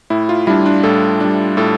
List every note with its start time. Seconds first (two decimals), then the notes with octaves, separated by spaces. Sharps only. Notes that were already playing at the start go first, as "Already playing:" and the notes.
0.10 A2 E4
0.29 F4
0.47 G3 D4 E4
0.66 D4
0.84 A2 A4
1.21 G3 D4
1.57 A2 A4